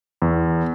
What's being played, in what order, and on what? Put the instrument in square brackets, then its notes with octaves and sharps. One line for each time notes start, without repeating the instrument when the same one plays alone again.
[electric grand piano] E2